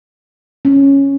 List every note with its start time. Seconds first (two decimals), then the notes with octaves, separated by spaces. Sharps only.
0.65 C#4